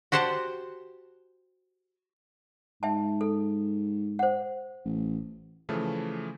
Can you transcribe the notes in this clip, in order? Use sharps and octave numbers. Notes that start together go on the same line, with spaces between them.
F#4 G4 C5 F#5 A5
G#2 E5 G5 A5
A4
C5 F#5
A1
C#3 E3 F3 A3